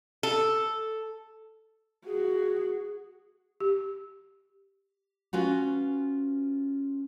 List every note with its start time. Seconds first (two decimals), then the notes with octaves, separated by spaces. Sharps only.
0.23 A4
2.06 F#4 G#4
3.60 G4
5.33 B3 C#4 F4 F#4